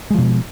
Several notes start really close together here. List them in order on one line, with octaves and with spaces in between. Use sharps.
G#3 F3 B2